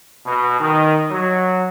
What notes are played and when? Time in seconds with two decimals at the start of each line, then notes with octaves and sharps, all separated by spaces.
0.25 B2
0.60 D#3
1.11 F#3